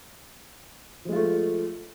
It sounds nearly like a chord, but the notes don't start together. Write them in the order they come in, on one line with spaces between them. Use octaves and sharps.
F3 G#3 F4 A3